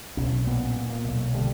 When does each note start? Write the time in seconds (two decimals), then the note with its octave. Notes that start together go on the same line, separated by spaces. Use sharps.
0.17 B1 C#4
0.46 A#2 B3
0.76 A#2
0.90 A#3
1.04 B1
1.33 D3 G3